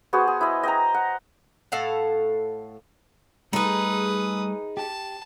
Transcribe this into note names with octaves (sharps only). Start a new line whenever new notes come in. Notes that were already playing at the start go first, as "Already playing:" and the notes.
B3 F#4 G#4 C5
G#4
E4 D#5
D#5 G5 A#5
F#5
A2 A4 F5 F#5
G3 A3 D#4 G#4 A4 B4 D#6
G4 A5